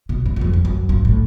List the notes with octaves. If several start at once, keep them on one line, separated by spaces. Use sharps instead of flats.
B2
G2
F#2
F2
G2
F#2
G2
A2